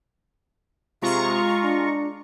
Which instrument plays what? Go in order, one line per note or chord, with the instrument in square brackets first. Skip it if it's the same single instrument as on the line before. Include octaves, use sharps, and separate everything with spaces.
[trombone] C3 [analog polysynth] G#3 A#5 C#6 [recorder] F4
[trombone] D4